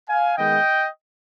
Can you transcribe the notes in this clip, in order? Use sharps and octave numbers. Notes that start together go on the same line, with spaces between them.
F5 G#5
D#3 G#3 B3 D#5 G5